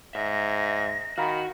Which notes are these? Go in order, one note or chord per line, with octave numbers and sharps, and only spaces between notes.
G#2 E5 A#6
D#3 F#4 F5 A#5 B5